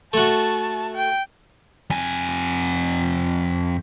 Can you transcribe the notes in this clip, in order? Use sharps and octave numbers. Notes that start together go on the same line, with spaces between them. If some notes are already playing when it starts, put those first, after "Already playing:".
A3 F#4 A5
G5
F2 G#5